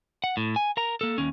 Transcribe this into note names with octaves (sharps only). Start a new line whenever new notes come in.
F#5
A2
G#5
A#4 A#5
A#3 A4
D#2 C#4